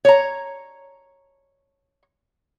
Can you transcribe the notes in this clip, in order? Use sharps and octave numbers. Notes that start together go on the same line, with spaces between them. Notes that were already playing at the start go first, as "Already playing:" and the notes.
C#5 A#5